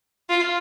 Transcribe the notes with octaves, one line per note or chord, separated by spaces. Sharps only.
F4